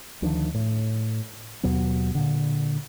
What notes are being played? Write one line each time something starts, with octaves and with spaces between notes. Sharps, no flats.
D2 D#3 F3 D4
A2
D#2 B2 F#3 B3
A#2 D3